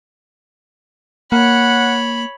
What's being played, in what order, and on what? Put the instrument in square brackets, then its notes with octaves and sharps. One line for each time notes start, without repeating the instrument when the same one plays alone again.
[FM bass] A#3 [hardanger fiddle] C#5 B5 [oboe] F#5